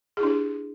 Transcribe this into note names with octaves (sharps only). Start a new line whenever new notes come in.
D4 E4 G4 G#4